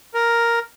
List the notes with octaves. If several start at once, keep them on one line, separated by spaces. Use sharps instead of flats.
A#4